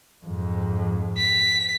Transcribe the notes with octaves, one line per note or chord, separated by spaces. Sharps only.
F2 G#2
B6